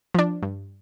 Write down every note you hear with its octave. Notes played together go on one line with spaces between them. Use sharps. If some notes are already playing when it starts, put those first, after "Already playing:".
F3 D4
G2